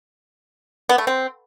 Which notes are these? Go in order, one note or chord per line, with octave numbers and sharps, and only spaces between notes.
B3
A3
C4